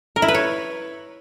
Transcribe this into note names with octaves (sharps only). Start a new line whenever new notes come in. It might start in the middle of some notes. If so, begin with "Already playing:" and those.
A#4
E4
B4
C#5